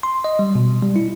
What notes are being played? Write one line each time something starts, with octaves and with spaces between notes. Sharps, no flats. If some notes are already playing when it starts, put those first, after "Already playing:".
C6
D#5
G3
B2
G3
E4